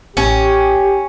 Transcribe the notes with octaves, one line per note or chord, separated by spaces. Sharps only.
A1 C#4 G4